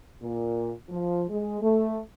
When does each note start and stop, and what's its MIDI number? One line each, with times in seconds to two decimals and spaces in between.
0.22 0.71 46
0.89 1.24 53
1.30 1.61 56
1.62 1.98 57